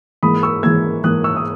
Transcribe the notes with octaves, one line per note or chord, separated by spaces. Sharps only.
G#2 E3 A#3 B5 D#6
C#6 E6
G#2 E3 A#3 E6 G#6
G#2 E3 A#3 D#6 F#6
C#6 E6
D#6